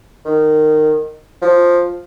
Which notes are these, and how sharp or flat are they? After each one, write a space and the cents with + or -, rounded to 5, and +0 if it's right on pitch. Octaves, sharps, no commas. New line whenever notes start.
D#3 -15
F3 +5